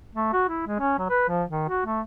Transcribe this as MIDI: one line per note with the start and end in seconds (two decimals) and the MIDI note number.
0.15 0.29 57
0.33 0.45 66
0.49 0.63 64
0.67 0.78 56
0.79 0.98 61
0.98 1.07 54
1.10 1.25 71
1.28 1.44 53
1.50 1.67 51
1.69 1.83 66
1.86 2.01 57